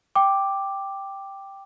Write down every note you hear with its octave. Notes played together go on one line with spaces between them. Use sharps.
G5 D6